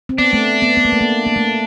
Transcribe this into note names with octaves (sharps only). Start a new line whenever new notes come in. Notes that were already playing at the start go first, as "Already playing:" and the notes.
C4
B3 D4
A3
B3
B3
A#3
A3
A#3
A#3
A3